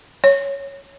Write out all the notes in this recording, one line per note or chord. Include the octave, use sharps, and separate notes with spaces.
C#5